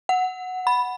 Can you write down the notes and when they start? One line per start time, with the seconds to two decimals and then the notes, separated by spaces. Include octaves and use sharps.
0.09 F#5
0.67 B5